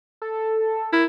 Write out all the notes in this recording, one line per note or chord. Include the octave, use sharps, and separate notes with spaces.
A4
E4 A#4